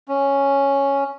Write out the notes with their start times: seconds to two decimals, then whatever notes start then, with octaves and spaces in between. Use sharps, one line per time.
0.08 C#4